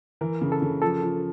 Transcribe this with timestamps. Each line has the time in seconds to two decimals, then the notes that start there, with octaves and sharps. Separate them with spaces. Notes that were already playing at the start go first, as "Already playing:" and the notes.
0.21 E3 A#4
0.41 C#3
0.52 A4
0.62 C#3
0.82 F3 A4
1.02 F3